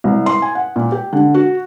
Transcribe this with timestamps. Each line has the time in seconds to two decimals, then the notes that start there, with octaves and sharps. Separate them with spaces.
0.04 C2
0.26 C6
0.42 G#5
0.55 F#5
0.76 A#2
0.92 G4
1.13 D3
1.34 F#4